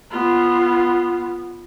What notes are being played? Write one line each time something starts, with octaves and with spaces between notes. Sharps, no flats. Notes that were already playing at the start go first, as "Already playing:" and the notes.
B3 F4